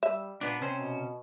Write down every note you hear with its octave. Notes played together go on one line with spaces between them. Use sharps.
G3 E5
A#2 B3 D4
C3 C4 C#4 C5
B2